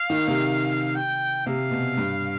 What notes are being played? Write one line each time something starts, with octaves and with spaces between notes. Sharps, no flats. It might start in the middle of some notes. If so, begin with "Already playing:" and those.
Already playing: F5
D#3
C3
G5
C3 F5
B2
G2